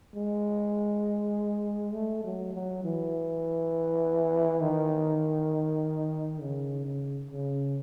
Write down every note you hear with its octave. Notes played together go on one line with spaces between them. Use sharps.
G#3
A3
F#3
F#3
E3
D#3
C#3
C#3
C#3